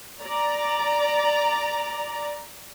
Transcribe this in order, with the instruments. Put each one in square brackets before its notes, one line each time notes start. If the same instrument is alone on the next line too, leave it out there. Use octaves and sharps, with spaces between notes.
[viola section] D5 A#5